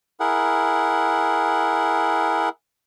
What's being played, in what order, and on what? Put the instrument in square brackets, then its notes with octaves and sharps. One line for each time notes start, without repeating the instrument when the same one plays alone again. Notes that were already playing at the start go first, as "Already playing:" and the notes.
[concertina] E4 G#4 A#4 F#5